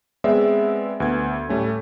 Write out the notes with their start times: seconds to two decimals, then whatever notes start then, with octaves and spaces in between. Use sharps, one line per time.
0.24 G#3 B3 C4 D5 E5
1.00 D2 B3 G#6
1.49 A2 G3 A3 C#4